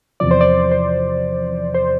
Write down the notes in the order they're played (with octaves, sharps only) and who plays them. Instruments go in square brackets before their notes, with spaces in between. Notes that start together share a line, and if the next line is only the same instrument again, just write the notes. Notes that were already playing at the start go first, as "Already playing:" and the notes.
[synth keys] E2 C3 F3 D5
C5
D5
C5
C5